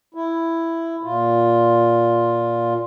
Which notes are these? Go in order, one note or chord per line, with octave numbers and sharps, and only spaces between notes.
E4
A#2 F4